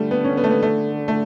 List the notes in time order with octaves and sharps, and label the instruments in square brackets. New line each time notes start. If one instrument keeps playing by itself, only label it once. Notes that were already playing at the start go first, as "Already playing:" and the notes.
Already playing: [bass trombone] D3 [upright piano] G3 A3
[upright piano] B3
C#4
B3
A3
B3
A3
A3